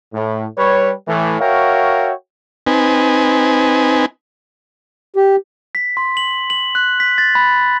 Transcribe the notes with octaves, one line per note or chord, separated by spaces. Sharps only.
A2
G3 B4 C#5
A2 E3
F#4 A#4 C#5 E5 F5 G5
C4 D#4 B4 G#5
G4
B6
C6
F#7
F#7
F#6
B6
A6
B5